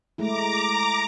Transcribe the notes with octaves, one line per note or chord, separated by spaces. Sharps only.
G#3 A3 E4 A#5 D6